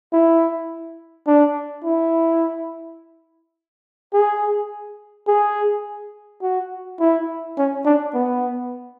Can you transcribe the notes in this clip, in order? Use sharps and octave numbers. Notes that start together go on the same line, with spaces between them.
E4
D4
E4
G#4
G#4
F#4
E4
C#4
D4
B3